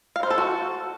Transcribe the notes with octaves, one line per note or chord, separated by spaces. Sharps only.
F5
C5
A4
F#4